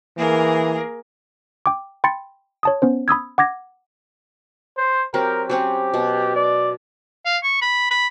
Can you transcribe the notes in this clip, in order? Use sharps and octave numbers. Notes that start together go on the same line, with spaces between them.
E3 A#3 G#4 A#4
G5 D6
G5 B5 C6 A6 C#7
C#5 A5 D#6
B3 C#4 C5
B5 D#6 E6 G#6
F#5 D6 G#6 A#6
C5
F#3 C4 G4 A#4
F#3 C4 C#4 G4
B2
D5
F5
C#6
B5
B5